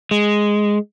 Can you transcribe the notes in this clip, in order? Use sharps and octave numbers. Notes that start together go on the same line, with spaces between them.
G#3